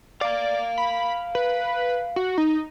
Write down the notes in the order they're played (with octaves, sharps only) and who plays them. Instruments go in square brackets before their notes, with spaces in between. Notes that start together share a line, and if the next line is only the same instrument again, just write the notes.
[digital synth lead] D5 [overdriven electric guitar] F5 A#5
[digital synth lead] B5
B4
F#4
D#4